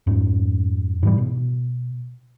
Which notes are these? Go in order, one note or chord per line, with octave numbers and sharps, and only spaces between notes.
F2 G#2
G#2 E3 G3
B2